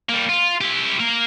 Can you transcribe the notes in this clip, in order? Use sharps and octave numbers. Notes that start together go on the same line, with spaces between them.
G3 A#3
F4
E4 G4
A#3 A#4